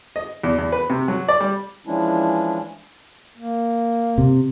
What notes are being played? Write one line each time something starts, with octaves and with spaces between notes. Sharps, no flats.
D#5
E2
E2
B4
C3
F#3
D5
G3
E3 F3 G#3 C#4 D4 E4
A#3
C3